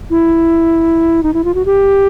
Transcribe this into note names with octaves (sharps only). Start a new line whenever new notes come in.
E4
D#4
E4
F4
F#4
G4